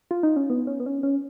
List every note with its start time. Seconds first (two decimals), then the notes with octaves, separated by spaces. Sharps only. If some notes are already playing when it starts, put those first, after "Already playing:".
0.11 F4
0.23 D#4
0.36 C#4
0.50 B3
0.67 C#4
0.80 B3
0.86 C#4
1.03 C#4